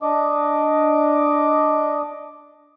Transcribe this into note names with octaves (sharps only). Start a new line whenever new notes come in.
D4 D#5 D6